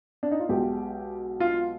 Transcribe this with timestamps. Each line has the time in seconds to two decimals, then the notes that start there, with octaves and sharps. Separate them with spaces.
0.23 D4
0.31 D#4
0.40 F4
0.49 B1 B2 G#3 G4
1.40 F4